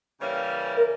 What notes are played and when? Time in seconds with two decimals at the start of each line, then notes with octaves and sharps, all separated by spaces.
0.19 C#3 E3 G3 A#3 C#4
0.76 A#4